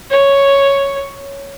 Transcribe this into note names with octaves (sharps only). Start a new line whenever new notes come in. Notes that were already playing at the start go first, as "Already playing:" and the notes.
C#5